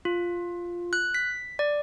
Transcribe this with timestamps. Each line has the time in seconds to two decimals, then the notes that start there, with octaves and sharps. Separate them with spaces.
0.05 F4
0.93 F#6
1.14 B6
1.59 D5